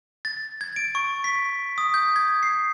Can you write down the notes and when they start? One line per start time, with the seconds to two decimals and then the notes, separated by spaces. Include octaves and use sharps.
0.25 A6
0.61 G#6
0.76 D7
0.95 C#6
1.24 B6
1.78 D#6
1.94 G6
2.16 G#6
2.43 C7